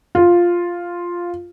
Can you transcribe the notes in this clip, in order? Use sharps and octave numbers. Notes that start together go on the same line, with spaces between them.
F4